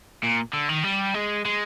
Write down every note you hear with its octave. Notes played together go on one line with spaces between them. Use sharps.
A#2
D3
D#3
G3
G#3
G#3